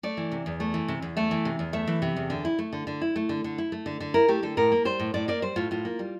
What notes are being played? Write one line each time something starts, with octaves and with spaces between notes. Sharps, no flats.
A3 D5
E3
C3
E2
A3
E3
C3
E2
A3 E5
E3
C3
E2
A3 E5
E3
C3
E2
D3
E4
A3
D3
D3
E4
A3
D3
D3
E4
A3
D3
D3
E4 A#4
A3 G4
D3 A4
A2 A#4
A#3
G3 C5
A2
A2 D5
A#3 D5
G3 C5
A2 F4
A2 F4
A#3
G3